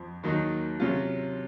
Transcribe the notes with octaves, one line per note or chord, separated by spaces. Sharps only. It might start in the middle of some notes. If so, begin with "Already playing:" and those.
Already playing: F2 F3
D#2 D#3 F#3 A#3 D#4
C3 F#3 C#4 F4